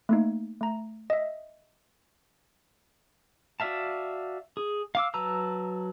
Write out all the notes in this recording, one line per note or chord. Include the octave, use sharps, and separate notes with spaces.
A3 A#3 D#4
A3 A#5
D#5 E5
F#4 D5 E5 F5 A5
G#4
F5 D6 E6
F#3 B4 A5 A#5 E6